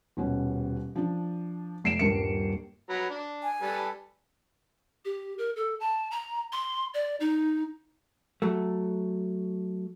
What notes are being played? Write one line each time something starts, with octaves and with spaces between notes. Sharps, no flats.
D#1 B2 C#4
F3 D4
F1 C7 D7 E7
D#1 G2 A#4 C#7
F#3 B4 A#5
D4
G#5
G3 A4 B4
G4
A#4
A4
A5
A#5
C6
D5
D#4
F#3 A3